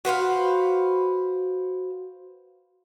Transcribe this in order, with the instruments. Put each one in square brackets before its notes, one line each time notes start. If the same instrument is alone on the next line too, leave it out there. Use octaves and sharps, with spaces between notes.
[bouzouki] F#4 B4 C5 F5